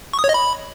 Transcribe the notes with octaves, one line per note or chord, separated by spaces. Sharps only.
C#6
D#6
C#5
D#5
B5